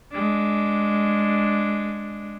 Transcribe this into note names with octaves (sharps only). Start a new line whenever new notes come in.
G#3 D4